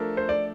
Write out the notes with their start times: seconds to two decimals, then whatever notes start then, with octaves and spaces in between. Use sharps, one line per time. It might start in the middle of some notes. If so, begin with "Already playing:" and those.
Already playing: F3 A3 D4 A4 A#4
0.17 C5
0.29 D5